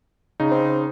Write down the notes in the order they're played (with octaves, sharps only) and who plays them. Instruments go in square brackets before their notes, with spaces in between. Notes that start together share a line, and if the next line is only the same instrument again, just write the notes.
[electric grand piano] C#3 D#4
[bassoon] C4